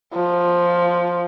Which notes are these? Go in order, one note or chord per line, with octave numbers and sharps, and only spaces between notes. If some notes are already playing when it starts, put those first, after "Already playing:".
F3